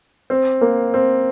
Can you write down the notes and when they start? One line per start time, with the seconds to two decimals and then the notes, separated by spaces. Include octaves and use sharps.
0.30 C4
0.61 A#3
0.94 C4